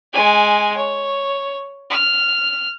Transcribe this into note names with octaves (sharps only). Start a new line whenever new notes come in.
G#3 G#5
C#5
F6